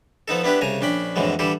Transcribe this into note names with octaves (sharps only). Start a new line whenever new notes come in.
F3 B3 D#4 A4
B3 D4 E4 G4 B4
C2 C#3 G#5 A#5
A#1 C#4 D4 G5 B5
F2 A2 D3 E3 F#3 G#3
D3 E3 G3 G4 A4